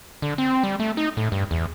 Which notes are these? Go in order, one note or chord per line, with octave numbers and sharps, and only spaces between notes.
D3
C4
G3
A3
D#4
A2
G2
E2